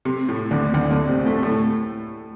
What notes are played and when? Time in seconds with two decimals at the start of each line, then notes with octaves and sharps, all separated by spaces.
0.05 C3
0.29 A2
0.51 D2 D3
0.74 D2 D3
0.91 D2 D3
1.09 C3 C4
1.26 A2 A3
1.43 A2 A3